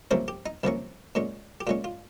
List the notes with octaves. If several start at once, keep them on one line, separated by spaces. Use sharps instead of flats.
C2 C3 F3 A#3 C#4 C5
G4
D#4
C2 C3 F3 A#3 C#4
A#2 G#3 C#4
G4
A#2 G#3 C#4 F4
F4